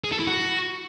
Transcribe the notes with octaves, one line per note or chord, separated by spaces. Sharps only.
G#4
A4
E4
F#4